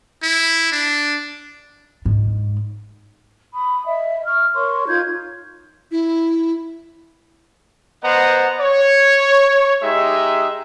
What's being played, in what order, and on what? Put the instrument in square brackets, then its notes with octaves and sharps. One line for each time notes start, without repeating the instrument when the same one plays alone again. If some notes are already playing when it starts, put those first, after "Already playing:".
[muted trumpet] E4
D4
[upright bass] G#2
[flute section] B5 D#6
D#5 E5
C#6 F6
A#4 C#5 C6 C#6
D#4 F4 G6 G#6
[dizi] E4
[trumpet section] B3 C5 D#5 F#5 A#5
C#5
G#3 D#4 G4 E5